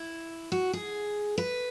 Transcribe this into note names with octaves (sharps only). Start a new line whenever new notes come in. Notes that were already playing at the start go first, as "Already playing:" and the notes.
Already playing: E4
F#4
G#4
B4